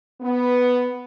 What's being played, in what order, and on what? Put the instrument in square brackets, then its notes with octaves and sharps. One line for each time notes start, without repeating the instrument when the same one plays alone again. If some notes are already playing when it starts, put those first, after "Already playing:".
[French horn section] B3